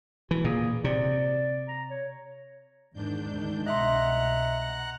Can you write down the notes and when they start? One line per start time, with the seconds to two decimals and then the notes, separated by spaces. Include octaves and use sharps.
0.31 E3 F#4
0.44 A#2 G#4
0.84 C3 D5
1.68 A#5
1.90 C#5
2.93 E2 G#2 D#3 D4 G6
3.27 D2 D#3
3.66 C2 B2 D#5 E5 F#5 A#5 C6 F#6